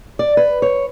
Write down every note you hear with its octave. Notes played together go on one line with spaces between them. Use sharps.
D5
B4
C#5